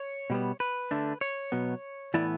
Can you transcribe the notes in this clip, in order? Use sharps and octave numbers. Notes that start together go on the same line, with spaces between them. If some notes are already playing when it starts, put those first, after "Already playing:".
Already playing: C#5
B2 G3 B3
B4
D3 A3 D4
C#5
B2 F#3 B3
A2 E3 B3 E4 D5